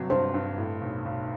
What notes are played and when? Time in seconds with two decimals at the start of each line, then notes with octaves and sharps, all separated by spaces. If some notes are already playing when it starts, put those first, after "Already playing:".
Already playing: G1 C3 F#3
0.10 G2 C5
0.34 G2
0.58 A2
0.81 B1
1.05 B1